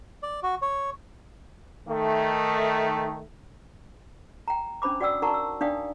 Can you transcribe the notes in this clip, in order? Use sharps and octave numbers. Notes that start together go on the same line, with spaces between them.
D5
F#4
C#5
D#3 A3
G5 A#5
C#4 D4 C5 B5 D6
F#4 D5 F#5 G5 D#6 E6
D#4 A#4 F#5 A5 A#5 C#6
E6
D4 D#4 D5 F5 G5 D#6